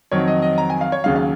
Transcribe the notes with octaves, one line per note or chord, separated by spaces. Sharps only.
F2 D#3 F#3 C#5
D#5
D#5
A#5
G#5
F5
C#5
D#2 C#3 F#3 F5
F5